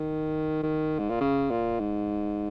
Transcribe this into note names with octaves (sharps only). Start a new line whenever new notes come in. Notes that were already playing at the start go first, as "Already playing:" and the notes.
Already playing: D#3
D#3
G#2
A#2
C#3
A#2
G#2